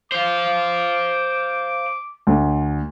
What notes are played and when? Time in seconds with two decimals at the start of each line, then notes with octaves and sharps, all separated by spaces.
0.12 C5 F5 D6
2.27 D2